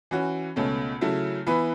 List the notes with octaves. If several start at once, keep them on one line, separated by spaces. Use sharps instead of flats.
E3 C#4 F#4
C#2 B2 A3 C#4
C#3 F#3 A3 E4
E3 B3 E4 B4